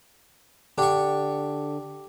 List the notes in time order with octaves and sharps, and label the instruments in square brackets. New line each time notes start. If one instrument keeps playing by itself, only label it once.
[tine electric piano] D3 D4 [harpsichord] G4 C#6